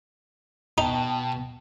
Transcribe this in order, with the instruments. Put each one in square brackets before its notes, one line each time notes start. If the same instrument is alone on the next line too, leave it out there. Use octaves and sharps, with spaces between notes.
[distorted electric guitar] B2 [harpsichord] D#4 [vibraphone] G5 A5